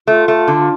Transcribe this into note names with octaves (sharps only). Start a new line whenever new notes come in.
A3 F4
A3
D3